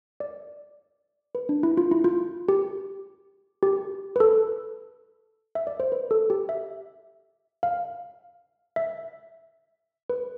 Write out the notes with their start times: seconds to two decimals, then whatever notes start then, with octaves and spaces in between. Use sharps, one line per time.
0.20 D5
1.35 B4
1.49 D4
1.63 E4
1.77 F4
1.91 E4
2.04 F4
2.49 G4
3.63 G4
4.16 B4
4.20 A4
5.55 E5
5.67 D5
5.80 C5
5.92 B4
6.11 A4
6.30 G4
6.49 E5
7.63 F5
8.76 E5
10.10 B4